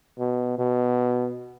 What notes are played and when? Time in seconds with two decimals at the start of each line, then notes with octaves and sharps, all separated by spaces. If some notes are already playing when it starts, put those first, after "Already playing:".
0.19 B2
0.58 B2